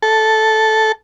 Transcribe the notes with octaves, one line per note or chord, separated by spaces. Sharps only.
A4